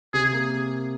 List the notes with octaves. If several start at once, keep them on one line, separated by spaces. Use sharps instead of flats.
C3 G#4
A#3